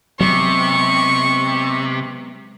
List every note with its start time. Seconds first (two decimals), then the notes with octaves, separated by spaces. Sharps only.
0.20 C3 F#3 G#3 B3 C#6